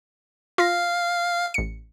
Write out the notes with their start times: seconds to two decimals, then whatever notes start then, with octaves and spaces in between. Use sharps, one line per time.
0.58 F4 F5 A#6
1.54 A1 C#7